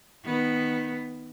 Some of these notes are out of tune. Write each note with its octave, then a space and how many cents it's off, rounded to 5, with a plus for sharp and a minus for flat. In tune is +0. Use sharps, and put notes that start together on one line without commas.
D#3 +0 B3 +0